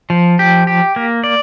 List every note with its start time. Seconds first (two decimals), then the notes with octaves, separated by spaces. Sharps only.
0.10 F3
0.39 G4
0.67 G4
0.96 A#3
1.24 D5